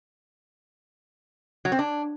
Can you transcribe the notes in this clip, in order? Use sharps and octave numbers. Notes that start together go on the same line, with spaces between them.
F#3
C4
D4